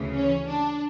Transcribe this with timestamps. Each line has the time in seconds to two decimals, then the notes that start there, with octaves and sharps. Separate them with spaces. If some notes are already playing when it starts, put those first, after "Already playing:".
Already playing: D2 C#3 E3
0.12 C#4
0.47 D4